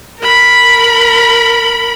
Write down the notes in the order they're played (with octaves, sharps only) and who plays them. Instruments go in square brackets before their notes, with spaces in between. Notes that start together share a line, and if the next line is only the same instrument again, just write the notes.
[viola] A#4 B5